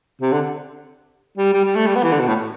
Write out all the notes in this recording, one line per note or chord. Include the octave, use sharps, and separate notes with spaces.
C3
D3
G3
G3
G3
A3
G3
B3
E3
D3
B2
A2